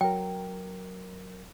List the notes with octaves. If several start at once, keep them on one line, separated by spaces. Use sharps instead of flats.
F#3 A#4 G5